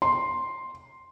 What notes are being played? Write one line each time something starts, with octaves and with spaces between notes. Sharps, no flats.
C6